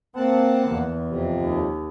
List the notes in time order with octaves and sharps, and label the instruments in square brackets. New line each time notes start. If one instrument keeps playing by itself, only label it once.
[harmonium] A#3 F#5 A5 [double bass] C4
[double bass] E2
[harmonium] F2 C3
[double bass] D#2